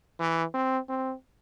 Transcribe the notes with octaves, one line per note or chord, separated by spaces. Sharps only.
E3
C4
C4